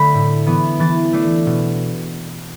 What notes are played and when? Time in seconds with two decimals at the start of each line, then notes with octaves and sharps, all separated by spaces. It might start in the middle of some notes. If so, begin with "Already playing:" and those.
Already playing: D3 A3 D4 B5
0.14 A2
0.46 E3 B3
0.80 E3 A6
1.13 A3 D4
1.47 B2